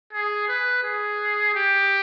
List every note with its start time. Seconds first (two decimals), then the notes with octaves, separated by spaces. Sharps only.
0.13 G#4
0.48 B4
0.84 G#4
1.55 G4